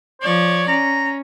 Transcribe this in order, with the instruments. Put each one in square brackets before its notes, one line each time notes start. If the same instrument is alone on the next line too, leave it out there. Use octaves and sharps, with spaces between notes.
[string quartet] F3 D5 [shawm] C#5
[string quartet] C#4 [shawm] A#5